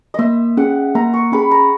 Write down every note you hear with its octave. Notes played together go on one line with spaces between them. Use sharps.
A#3 D#5 E5
C#4 G#4 F#5
A#3 A#5
C#6
C#4 G#4 B5
A#5